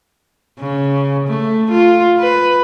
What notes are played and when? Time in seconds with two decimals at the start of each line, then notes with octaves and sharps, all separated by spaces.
0.59 C#3
1.28 A3
1.71 F4
2.19 B4